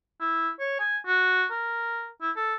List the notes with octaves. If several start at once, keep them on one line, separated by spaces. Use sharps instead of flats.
E4
C#5
G#5
F#4
A#4
E4
A4